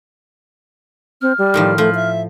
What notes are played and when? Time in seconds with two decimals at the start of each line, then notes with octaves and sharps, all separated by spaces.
1.22 C4 F6
1.38 G3
1.54 A2 D#3 F3
1.78 F3 A3
1.95 E5